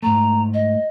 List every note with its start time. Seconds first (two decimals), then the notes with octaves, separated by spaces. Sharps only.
0.03 G#2 A3 A#5
0.54 D#5